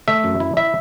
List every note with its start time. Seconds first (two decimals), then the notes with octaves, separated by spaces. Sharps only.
0.08 A3 E5
0.24 F#2
0.40 E4
0.57 E4 E5